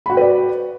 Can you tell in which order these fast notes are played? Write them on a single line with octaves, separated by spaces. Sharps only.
B5 F#4 G5 B4 D5